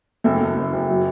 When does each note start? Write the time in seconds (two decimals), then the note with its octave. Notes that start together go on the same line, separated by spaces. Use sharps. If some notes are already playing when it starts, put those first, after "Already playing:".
0.24 F#1 A3
0.41 F#1
0.57 F#1
0.73 F#1
0.89 F#3